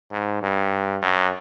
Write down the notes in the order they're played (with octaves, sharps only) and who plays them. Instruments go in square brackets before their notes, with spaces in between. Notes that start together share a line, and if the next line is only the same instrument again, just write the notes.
[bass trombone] G#2
G2
F#2